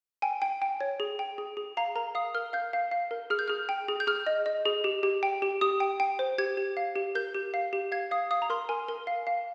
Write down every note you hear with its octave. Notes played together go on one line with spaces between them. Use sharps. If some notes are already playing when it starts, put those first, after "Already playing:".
G5 G#5
G5
G5
C#5
G#4
G5
G#4
G#4
F5 A#5
A#4 A#5
F5 D#6
A#4 F6
F5 G6
F5
F5
A#4
G#4 F6
G6
G#4 F6
G5
G#4
G6
G#4 F6
D#5
D#5
G#4
G4
G4
G5
G4
G4 D#6
G5
G5
C5
G4 G#6
G4
F5
G4
A#4 G6
G4
F5
G4
F5 G#6
F5 D#6
F5 D#6
A#5
A#4 C6
A#4 G#5
A#4
F5
F5